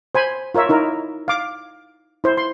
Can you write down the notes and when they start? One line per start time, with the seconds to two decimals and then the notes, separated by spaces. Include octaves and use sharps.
0.15 C5 G#5 B5
0.55 F4 A#4 C#5 E5
0.69 D#4 E4 A#4
1.28 F5 D6
2.24 E4 C5
2.37 C6